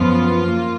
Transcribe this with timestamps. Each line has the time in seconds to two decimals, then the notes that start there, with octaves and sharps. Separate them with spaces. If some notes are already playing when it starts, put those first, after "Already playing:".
Already playing: F#2 F3 B3 F4
0.46 A#3